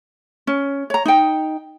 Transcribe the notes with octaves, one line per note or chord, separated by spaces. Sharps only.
C#4
C#5 A#5
D#4 G5